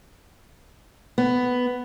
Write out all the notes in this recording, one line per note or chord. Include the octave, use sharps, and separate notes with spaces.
B3